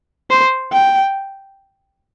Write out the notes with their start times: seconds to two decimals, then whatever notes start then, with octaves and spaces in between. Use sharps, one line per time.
0.30 C5
0.73 G5